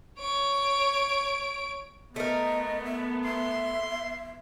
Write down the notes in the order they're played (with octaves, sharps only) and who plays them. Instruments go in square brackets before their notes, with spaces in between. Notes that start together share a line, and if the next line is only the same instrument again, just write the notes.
[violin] C#5 D7
[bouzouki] A3 A#4 [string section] B3 [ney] D#5
[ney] E5
[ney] E5 [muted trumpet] C6